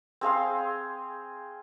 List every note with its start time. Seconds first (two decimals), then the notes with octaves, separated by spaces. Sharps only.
0.21 C4 G#4 F5 C6